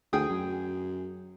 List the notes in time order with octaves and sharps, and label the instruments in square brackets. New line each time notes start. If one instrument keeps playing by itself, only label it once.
[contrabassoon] D2 [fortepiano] G#4 G5 D#6
[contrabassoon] F#2